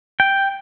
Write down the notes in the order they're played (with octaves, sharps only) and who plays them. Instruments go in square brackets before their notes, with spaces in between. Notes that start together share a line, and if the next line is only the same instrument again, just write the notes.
[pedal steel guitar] G5